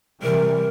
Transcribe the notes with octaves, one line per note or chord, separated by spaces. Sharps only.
C3 E3 G3 A#4